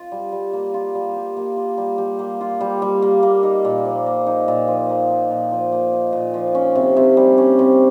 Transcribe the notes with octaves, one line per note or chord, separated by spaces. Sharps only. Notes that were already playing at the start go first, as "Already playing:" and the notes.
Already playing: F4
G3
G3
A#3
F4
G3
G3
A#3
F4
G3
G3
A#3
F4
G3
G3
A#3
A#3
D#4
A#2
F3
A#3
D#4
A#2
F3
A#3
D#4
A#2
F3
A#3
D#4
A#2
F3
C#4
C3
C3
G3
C#4
C3